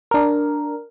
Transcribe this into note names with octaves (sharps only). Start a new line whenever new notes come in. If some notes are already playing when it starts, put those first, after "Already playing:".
D4 A#4